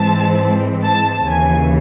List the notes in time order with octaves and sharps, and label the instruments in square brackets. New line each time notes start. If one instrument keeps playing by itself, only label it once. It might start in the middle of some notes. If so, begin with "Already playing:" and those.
Already playing: [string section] G#2 E3 G#3 C4 A5
A5
D#2 C#3 E3 G#5